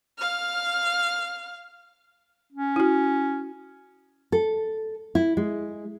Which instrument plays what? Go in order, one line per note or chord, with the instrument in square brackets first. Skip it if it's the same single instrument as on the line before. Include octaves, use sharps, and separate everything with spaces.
[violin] F5 F6
[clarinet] C#4
[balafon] E4 F#4
[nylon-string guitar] A4
E4
G#3